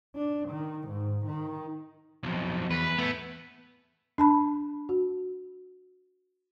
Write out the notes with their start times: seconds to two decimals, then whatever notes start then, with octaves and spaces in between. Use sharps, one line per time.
0.16 D4
0.50 D#3
0.88 G#2
1.26 D#3
2.23 B1 F2
2.71 E2 B4
2.98 A3 B3 E4
4.18 D4 A5 B5
4.89 F#4